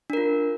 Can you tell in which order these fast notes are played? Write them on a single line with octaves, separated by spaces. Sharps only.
D4 A#4 F4